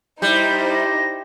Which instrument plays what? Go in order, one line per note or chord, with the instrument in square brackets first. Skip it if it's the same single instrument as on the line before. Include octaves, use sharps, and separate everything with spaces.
[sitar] G3 [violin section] D#4 E4 C5 [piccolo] G6
[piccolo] A#6